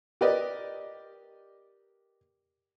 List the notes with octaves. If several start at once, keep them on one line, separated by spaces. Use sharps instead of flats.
G4 A#4 B4 D5 D#5